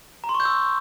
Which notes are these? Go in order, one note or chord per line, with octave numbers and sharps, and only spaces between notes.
A#5
C6
C#6
G6
E6